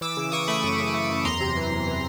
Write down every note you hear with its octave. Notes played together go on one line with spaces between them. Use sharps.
E3 D6 E6
C#3
E3 C#6 D#6
A3 B5 C#6
F#2
C#3
A3
F#2
E2 A#5 C6
C3
E3
E2
E3